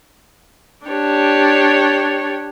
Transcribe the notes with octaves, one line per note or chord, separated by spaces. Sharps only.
D4 G4 C#5